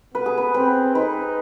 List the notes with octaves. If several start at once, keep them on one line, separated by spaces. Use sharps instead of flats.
B3 B4
G#4
B4
C4 B4
D#4 B4